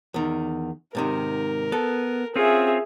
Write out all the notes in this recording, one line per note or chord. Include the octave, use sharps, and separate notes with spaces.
E2 D#3
G#2 C3 D#3 A#4
B3 A4
C4 C#4 F4 G#4 E5